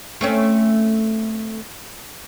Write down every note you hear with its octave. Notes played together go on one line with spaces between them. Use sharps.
A3 C4 C#4